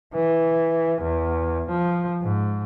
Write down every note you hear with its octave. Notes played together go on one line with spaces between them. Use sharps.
E3
E2
F3
G#2